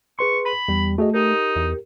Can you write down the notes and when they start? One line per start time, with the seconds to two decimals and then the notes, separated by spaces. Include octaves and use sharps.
0.19 G#4 B4 C6 C#6
0.45 B5
0.68 E2 G3
0.98 A3 F#4 G#4 D#5
1.14 D#4 G4 A#4
1.56 E2